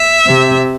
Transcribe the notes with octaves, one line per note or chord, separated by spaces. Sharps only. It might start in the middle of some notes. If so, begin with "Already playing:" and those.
Already playing: E5
C3